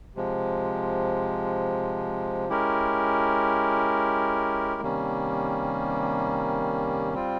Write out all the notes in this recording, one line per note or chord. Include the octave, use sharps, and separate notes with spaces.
C3 F3 G#3
G#3 C#4 E4 G4 A#4
C3 D#3 G3 A#3 C#4
G3 C4 F4